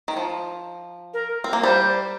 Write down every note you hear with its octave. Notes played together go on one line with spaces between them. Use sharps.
D#3
F3
A#4
C4
A#3
G3 C5